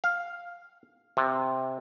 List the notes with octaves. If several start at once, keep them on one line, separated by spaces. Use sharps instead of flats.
F5
C3